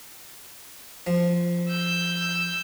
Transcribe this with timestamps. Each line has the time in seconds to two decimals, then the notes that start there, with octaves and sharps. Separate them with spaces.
1.07 F3
1.69 E6 G6